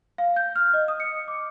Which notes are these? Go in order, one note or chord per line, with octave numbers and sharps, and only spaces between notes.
F5
G6
F6
D#5
D#6
C#7
D6